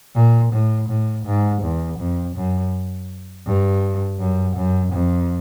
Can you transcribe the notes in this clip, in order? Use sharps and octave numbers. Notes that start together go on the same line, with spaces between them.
A#2
A2
A2
G#2
E2
F2
F#2
G2
F#2
F#2
F2